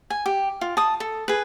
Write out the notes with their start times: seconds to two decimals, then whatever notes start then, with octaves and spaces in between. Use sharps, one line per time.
0.10 G#5
0.26 G4
0.61 F4
0.77 A5 D#6
1.00 A4
1.28 G#4 B4